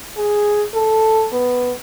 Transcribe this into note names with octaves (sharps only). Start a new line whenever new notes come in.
G#4
A4
B3